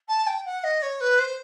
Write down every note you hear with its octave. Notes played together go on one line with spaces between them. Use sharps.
A5
G5
F#5
D#5
C#5
B4
C5